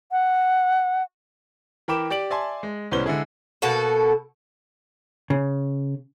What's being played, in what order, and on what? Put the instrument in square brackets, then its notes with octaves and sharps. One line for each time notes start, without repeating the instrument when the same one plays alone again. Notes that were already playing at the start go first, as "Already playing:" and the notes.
[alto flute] F#5
[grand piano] E3 A#4 G5 B5 D6 E7
G4 D5 D7 F#7
D5 E5 G#5 A5 C6
G#3
C2 A2 B3 C#4 C5 G7
D3 G#3 E4 G#4
[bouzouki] B2 A#3 F#4 A4
[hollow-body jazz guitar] C#3